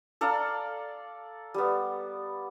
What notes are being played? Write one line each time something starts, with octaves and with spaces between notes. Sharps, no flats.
A4 D5 F5 A#5
G3 B3